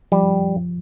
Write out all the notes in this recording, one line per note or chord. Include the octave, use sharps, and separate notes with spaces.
F3 G3